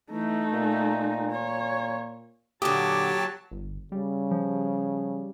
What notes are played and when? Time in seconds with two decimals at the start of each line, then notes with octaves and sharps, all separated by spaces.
0.11 E3 A3 D#4
0.51 A#2
1.31 C#5
2.62 A#2 D3 F#3 G4 A5 D6 D#6
3.51 G1
3.92 C#3 G3
4.31 F3